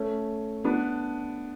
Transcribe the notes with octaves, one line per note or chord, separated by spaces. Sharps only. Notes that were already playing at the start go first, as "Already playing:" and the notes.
Already playing: A3 C#4
B3 D4